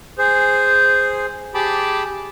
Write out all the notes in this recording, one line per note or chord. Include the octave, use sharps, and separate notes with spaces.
G#4 C5
G4 G#4 A5 B5 D6